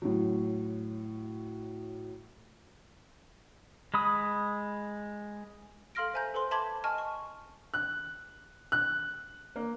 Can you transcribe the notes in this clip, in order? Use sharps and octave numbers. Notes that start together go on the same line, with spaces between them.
A2 F#3
G#3 B5 D#6
A4 F5 C6 F6 A#6 D7
C5 E5 G#5 A#5 G6
A4 B4 C5 C6
E5 A5 B5 C6 D6 G#6
D#5 G#5 A5 C#6 F6
C#6
F#6
F#6
A#3